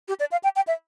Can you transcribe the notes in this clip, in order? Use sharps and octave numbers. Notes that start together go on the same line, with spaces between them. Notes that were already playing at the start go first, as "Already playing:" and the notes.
G4
D5
F5
G5
G5
E5